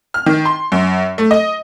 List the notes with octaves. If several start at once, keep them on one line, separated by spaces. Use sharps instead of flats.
F6
D#3
C6
F#2
A3
D#5